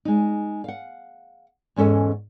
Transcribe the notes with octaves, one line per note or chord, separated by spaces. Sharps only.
G#3 D#4
F5 F#5
E2 G#2 C#4 A4 D#5